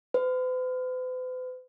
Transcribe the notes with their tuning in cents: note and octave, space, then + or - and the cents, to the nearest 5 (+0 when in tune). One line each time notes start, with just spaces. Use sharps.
B4 +45